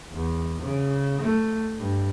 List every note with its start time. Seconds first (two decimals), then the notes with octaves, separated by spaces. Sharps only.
0.12 E2
0.62 C#3
1.21 A3
1.78 G2